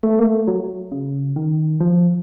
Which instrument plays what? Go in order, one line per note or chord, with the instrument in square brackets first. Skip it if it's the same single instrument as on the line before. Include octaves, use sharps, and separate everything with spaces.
[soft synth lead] A3
A#3
A3
F#3
C#3
D#3
F3